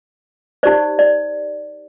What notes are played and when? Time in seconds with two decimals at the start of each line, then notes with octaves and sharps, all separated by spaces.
0.63 D#4 G4 C5 D5
0.99 D5